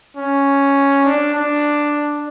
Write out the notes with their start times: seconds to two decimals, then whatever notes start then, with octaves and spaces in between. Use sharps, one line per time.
0.17 C#4
1.06 D4
1.35 D4